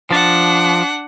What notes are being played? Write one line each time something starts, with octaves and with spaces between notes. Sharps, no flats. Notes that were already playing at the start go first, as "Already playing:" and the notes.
F3 D4 F#5 A5